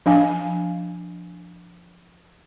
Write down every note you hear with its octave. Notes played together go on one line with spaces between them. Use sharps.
F3 D4 F5 G#5